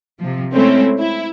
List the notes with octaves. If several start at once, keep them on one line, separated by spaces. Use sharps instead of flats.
C3 F3
G#3 A3 C4 C#4 E4
E4